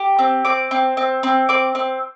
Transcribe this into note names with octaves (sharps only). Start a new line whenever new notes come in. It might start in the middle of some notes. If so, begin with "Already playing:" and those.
Already playing: G4
C4
C4 D6
C4
C4
C4
C4 D6
C4